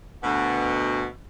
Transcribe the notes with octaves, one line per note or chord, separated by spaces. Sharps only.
D2 B2